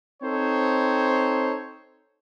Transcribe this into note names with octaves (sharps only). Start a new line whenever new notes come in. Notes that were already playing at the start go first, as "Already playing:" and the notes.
C4 D#4 A4 C5 C#5